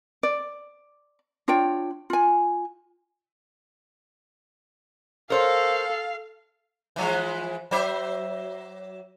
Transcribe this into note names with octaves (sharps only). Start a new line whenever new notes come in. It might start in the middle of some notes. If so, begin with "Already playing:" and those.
D5
D4 F4 C#5 G5
F4 G#5
A4 A#4 C5 C#5 F5
E3 F3 G#3
F#3 C5 E5